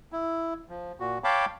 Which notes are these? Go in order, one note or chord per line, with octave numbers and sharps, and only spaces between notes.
E4
F3
A#2 F#4
C#5 F5 G5 A5 B5 D6